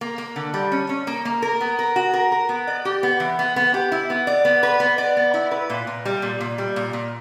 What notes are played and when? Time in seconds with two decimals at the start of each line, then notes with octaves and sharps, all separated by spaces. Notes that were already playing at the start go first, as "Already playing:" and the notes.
0.01 A#3
0.18 A#3
0.36 D3
0.54 G3
0.72 C#4
0.89 C#4
1.07 A#3
1.25 A#3
1.42 A#4
1.61 B3
1.79 A#4
1.96 F#4
2.13 A#4
2.32 A#4
2.49 B3
2.67 D5
2.85 G4
3.03 B3
3.20 E3
3.39 B3
3.56 B3
3.74 G4
3.92 E4
4.10 B3
4.27 D5
4.45 B3
4.63 B4
4.80 B3
4.98 D5
5.17 B3
5.34 E4
5.51 B4
5.70 A#2
5.87 A#2
6.05 G3
6.22 A#2
6.41 A#2
6.58 G3
6.76 A#2
6.93 A#2